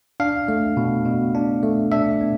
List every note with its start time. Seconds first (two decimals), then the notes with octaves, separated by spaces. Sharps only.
0.20 D4 F5
0.48 A3
0.77 B2
1.06 B2
1.35 D4
1.63 A3
1.92 D4 E5
2.21 B3